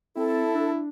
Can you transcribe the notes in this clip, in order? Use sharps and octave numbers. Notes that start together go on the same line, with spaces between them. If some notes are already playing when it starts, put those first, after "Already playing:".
C4 E4 A4
D4